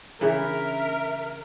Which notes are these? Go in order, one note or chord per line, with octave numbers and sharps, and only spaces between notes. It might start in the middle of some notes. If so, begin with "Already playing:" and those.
C#3 E3 D4 G#4 A#4 C#5 E5